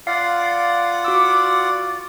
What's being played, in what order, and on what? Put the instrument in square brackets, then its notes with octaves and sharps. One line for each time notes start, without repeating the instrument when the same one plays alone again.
[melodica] F4 D5 F#5 [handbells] F5 C7
[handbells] F#4 D6 E6